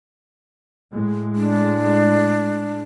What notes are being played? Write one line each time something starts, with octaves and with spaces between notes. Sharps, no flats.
A2 G#3
D4